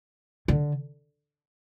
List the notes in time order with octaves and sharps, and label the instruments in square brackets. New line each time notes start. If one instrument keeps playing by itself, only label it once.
[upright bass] D3